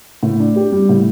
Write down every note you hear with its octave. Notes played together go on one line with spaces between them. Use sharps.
A2
D4
G4
G3
A2